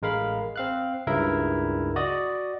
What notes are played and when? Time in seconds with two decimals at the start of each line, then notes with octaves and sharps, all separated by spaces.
0.02 A1 G#3 A#4 F5 B5
0.56 C4 F5 F#6
1.07 C#2 G2 C#3 E4 A#4 E5
1.96 F#4 D5 D#5 D#6